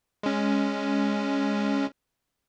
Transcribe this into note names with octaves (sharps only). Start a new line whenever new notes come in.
G#3 C#4